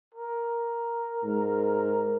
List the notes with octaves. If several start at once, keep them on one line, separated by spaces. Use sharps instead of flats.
A#4
G#2